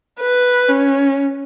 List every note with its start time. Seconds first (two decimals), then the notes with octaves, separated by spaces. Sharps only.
0.21 B4
0.69 C#4